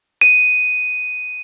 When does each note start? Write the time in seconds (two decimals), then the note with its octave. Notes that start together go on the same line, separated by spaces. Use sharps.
0.21 D#7